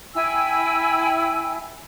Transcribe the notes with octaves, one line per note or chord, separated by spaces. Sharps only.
E4 G5 G#5 E6